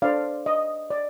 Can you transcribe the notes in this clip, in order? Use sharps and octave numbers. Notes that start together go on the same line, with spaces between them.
D4 A4 C5 D5 F5
D#5
D5